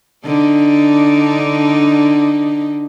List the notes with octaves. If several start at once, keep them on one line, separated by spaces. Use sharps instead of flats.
D3 D4 D#4